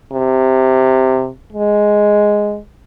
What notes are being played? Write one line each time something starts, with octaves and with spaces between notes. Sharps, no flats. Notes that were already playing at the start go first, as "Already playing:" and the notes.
C3
G#3